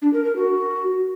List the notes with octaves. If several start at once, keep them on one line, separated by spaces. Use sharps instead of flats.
D4
A#4
A#4
F#4